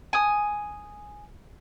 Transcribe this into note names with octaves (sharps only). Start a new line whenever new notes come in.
G#5 D#6